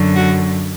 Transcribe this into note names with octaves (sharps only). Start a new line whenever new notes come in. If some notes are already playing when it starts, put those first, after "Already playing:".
Already playing: F#2 D3 F#3
F#4